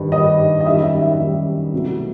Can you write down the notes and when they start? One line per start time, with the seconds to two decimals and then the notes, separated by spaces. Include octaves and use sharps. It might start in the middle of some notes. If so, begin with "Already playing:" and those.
Already playing: G2 D#3 G3
0.12 G2 D#3 G3 D#5
0.61 D#5
0.66 F#2 D#3 G3 E5
0.83 E5
1.02 E5
1.19 F#2 D#3 G3
1.73 C2 B2 F#3 A3